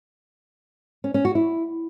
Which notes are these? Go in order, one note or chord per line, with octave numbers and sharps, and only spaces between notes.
C#4
C#4
F#4
E4